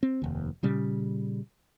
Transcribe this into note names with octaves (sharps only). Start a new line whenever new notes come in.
C4
F1 D#2
A#2 C#3 G3